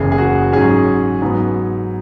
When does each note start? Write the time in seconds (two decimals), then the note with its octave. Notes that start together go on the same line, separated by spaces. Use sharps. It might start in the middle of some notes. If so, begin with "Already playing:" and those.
Already playing: F#1 E2 C#3 G#4
0.12 G#4
0.18 F#4
0.52 G#2 F#3 C#4 G#4
1.22 G#2 F#3 B3